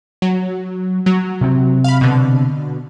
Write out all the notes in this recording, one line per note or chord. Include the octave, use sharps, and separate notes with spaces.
F#3
F#3
C3 C4
F5 B5
B2 D3